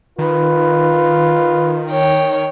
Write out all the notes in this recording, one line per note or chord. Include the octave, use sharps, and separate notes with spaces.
D#3 F4 B4
C#5 G5